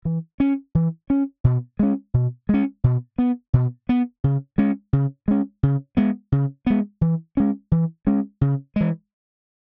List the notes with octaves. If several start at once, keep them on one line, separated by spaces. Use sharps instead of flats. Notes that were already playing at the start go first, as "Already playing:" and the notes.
E3
C#4
E3
C#4
B2
G#3 C#4
B2
G#3 C#4
B2
B3
B2
B3
C#3
G#3 C#4
C#3
G#3 C#4
C#3
G#3 B3
C#3
G#3 B3
E3
G#3 C#4
E3
G#3 C#4
C#3
E3 G#3